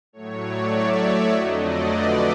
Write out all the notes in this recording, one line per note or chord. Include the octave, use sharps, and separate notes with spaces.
A2 F#3 A3 C#5
D5
E5
E5
F2 D3 F#3 A3 D#5
D5
B4